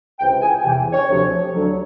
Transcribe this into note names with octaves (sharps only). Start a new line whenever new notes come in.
C#2 C3 E3 G5
G#5
E2 C3 E3 G5
C#5
D2 C3 F3
D2 D3 F#3